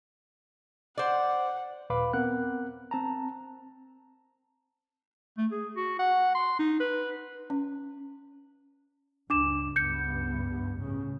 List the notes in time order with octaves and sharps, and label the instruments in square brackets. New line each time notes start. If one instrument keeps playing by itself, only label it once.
[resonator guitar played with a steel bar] C5 D5 [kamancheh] F#5
[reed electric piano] D#2 A#2 B4 F5 B5 D6
B3 C4 A#4 F#5 F#6
C4 A5 A#5
[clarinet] A3
G#4
F#4
F#5
C6
D#4
B4
[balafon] C#4
[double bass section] C#2 G2 [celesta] D4 D6 E7
[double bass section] C#2 G2 B3 [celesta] G6 C#7
[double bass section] A2 C#3